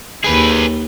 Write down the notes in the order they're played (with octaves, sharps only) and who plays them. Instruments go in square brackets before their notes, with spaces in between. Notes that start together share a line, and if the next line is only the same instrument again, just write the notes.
[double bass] D#2 [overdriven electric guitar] G#4 B4